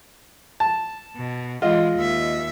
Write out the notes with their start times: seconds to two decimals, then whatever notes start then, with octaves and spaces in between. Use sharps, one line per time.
0.60 A5
1.16 B2
1.62 E3 G#3 F4 D#5
1.95 D#2 E5